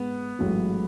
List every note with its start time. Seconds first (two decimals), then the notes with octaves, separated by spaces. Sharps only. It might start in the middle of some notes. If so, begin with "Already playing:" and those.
Already playing: G#2 B3
0.39 A1 G#2 F#3 A3